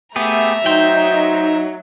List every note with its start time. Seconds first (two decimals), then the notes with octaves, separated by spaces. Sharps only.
0.16 A3 B3 G4 G#4 E5 A#5
0.66 F#3 D#4 C5 G5